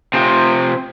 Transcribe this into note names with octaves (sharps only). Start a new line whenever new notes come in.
C3 F3